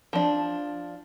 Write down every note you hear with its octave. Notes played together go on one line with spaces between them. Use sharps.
F3 D4